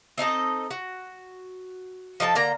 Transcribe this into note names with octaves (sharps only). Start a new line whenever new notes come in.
C4 D#4 A4 D#5
F#4
F3 D#4 A4 A5
D3 A#3 A#5